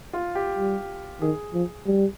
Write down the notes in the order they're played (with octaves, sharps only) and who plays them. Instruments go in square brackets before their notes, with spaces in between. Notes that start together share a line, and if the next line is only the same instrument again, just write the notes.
[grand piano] F4
G4
[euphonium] G3
[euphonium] D#3 [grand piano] G#4
[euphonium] F3
G3